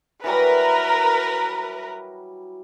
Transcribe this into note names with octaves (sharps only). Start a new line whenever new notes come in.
E3 F#3 G3 A#4 B4